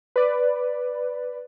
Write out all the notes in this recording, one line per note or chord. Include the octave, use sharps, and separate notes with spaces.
B4 D5